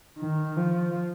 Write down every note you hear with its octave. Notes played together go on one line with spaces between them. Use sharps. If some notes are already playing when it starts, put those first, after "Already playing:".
D#3
F3